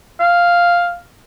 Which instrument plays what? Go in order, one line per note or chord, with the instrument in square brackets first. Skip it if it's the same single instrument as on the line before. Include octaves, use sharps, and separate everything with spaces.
[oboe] F5